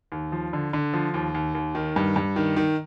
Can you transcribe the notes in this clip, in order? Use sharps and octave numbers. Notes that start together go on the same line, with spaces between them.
D#2
F3
D3
D3
F3
D#2
D#2
D#2
D#3
G2
G2
D#3
D#3